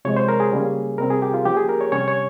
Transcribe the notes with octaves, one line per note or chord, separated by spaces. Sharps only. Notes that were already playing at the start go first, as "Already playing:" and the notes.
C3 F3 G#3 C#5
C5
A#4
G#4
C#3 G3 A#3 C#4
C3 G3 C4 A#4
G#4
G4
F4
F3 A#3 C#4 G4
G#4
A#4
C#5
C3 G3 C#4 C#5
C#5